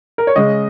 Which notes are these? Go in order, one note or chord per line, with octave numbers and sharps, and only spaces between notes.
A#4
C#5
C#3 G#3 C#4 D#5